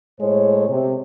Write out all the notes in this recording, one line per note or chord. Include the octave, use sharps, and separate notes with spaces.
A2 G#3 A4 C5 C#5
C3